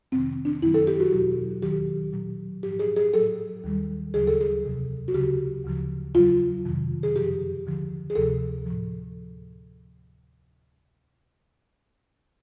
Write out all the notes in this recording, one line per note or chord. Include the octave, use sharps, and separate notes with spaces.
F2 C3 D#3 C4
D4
F#2 D#3 F#3 E4
A4
G4
F#4
E2 B2 F#3
D#2 D#3 F#3 G4
A#2 F#3
G#2 F3 G4
G#4
G#4
A2 F#3 A4
D#2 D#3 G3
D2 C#3 F#3 G#4
A4
G#4
E2 C3 F3
F#4
D2 C#3 F#3 G4
D2 C#3 F3
E2 C#3 F#3 F4
F2 C3 D#3
G#4
F#2 C#3 F3 G4
D#2 D3 F3
G#4
D2 C3 F3 A4
A2 F3